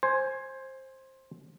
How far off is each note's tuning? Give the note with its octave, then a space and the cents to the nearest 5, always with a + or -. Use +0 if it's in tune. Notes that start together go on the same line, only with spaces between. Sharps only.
C5 +15 G#5 +0